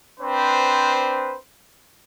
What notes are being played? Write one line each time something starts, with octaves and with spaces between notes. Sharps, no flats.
C4 D4 B4 C5